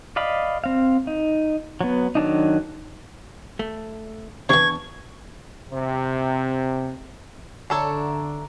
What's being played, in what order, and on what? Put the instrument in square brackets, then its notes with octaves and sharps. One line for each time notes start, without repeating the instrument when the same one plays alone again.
[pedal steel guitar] D5 D#5 F5 B5
C4 F5
D#4
F#3 B3
D#3 F#3 D4 D#4
[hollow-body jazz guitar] A3
[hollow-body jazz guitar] E2 D4 [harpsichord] C3 E3 [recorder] C#6 [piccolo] G#6
[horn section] C3
[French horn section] D3 [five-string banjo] D4 A4 C#5 [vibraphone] E5 A#5